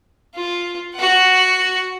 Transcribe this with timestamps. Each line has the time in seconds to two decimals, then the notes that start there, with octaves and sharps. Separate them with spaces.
0.35 F4
0.95 F#4 F#5